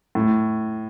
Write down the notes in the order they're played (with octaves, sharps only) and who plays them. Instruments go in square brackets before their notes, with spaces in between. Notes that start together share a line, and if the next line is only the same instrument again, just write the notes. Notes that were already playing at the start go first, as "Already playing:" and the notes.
[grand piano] A2